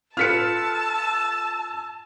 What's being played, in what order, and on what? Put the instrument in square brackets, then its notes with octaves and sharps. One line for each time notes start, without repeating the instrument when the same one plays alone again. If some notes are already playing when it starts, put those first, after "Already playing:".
[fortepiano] F4 A4 B4 [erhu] A5 [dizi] E6 [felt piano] F6 B6 C#7